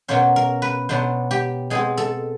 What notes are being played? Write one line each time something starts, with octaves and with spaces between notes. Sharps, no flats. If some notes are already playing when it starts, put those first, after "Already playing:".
B2 F#3 A#3 C#4 C5
A#4
B4
B2 F#3 B3 D4 C5
G4
B2 G#3 C4 G#4
A4